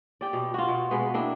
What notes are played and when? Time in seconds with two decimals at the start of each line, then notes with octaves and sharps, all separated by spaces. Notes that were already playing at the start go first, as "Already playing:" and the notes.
0.21 G4 D5
0.33 B2
0.54 F4 F#4
0.68 B2
0.91 B2 G#3 B3 B4
1.14 A#3 C4 D4 E4